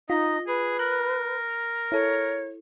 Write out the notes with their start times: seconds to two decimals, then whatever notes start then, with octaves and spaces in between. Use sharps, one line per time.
0.10 D#4 F4 D#5
0.47 G#4 B4
0.79 A#4 F#6
1.92 E4 A4 C#5